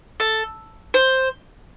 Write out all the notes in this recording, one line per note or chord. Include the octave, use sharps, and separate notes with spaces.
A4
C5